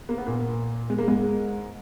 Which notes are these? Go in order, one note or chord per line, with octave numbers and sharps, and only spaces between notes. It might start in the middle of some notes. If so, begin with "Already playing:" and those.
A#3
B3
A#2 A#3
G#3
A#3
G#2 G#3